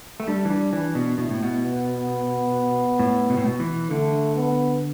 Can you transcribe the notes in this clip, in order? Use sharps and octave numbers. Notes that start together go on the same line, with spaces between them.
A3
G3 D4
E3
G3
E3 D4
B2
B2 E4
A2
B2
B3
A2
B2
A2
B2
E3
D3 A3
B3